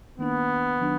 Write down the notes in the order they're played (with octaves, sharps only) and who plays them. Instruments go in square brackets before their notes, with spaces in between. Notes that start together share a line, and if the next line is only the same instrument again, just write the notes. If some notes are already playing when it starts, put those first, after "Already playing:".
[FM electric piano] D#3 A#3 D4 [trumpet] B3
[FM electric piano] D#3 F#3 D4